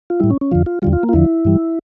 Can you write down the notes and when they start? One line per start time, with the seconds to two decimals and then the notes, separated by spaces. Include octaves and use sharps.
0.10 F4
0.20 A2 G3 E4
0.30 C#4
0.41 C#4
0.51 F2 D3 F3 F4
0.66 F4
0.82 E2 D3 G3 F4
0.93 F4
1.03 A#3
1.09 F4
1.13 E2 D3 F3 E4
1.45 G2 E3 G3